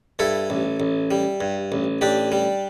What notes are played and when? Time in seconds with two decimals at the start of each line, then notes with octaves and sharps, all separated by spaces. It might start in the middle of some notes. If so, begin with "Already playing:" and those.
0.19 G2 E4 A4
0.50 A1
0.80 A1
1.11 G3
1.41 G2
1.72 A1
2.01 A1 D4 G4
2.32 G3